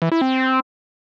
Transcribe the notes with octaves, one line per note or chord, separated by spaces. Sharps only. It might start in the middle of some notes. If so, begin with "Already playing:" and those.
E3
E4
C4